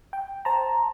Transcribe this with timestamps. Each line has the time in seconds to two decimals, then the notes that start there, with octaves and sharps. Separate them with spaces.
0.13 G5
0.45 C5 A5 A#5